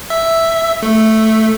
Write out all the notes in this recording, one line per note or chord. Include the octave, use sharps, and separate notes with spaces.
E5
A3